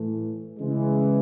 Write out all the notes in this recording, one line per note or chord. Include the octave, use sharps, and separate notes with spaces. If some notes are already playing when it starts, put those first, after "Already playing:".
Already playing: A2 E3 A3
C#3 E3 G#3